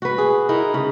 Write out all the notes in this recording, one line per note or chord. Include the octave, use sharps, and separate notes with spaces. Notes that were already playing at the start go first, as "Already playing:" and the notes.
F#4 B4
G#4
D#4 E4 A#4
C#3